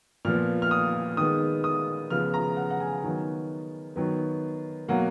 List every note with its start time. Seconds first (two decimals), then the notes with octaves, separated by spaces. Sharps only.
0.25 A#2 F3 B3 F6
0.62 F6
0.71 D#6
1.17 D#3 G#3 B3 D#6
1.64 D#6
2.10 C#3 F3 B3 F6
2.34 A#5
2.56 F#5
2.70 F#5
2.80 G#5
3.04 D#3 F#3 B3
3.96 D#3 F#3 B3
4.88 B2 F#3 A#3 F#5